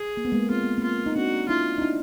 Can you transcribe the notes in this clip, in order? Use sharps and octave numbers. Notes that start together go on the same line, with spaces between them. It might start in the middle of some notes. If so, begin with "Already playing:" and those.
Already playing: G#4
A#3
B3
G#3 A#3
C4 F4
B3
A#3 C4
F4
D#4
C4 D4 F#4
D4 E4 F4
D#4
D4 E4